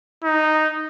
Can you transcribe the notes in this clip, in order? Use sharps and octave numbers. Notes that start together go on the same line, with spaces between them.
D#4